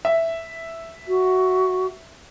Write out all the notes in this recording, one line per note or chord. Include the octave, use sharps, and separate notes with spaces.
E5
F#4